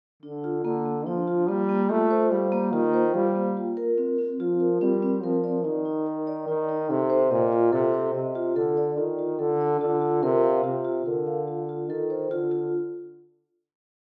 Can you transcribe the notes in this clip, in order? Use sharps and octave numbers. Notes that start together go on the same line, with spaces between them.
D3 D4
F4
D3 A#3
A#3
F3 D4
F4
G3 A#3
A#3
A3 F4
C5
G3 F5
A#3
D#3 F4
C5
G3 F5
A#3
F4
A#4
C4
C4
F3 F4
A#4
G3 C4
C4
F3 A#4
D5
D#3 D#4
D#4
A#4
D5
D#3 D#4
D#4
C3 A4
C5
A#2 D#5
F4
C3 A4
C5
C3 D#5
F4
D3 A4
D5
D#3 F4
F4
D3 A4
D5
D3 F4
F4
C3 A#4
F5
C3 F4
F4
D3 A#4
F5
F4
F4
D#3 A4
C5
D3 F4
F4